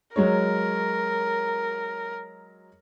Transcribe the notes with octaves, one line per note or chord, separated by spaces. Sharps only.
F#3 G#3 A#4 C#5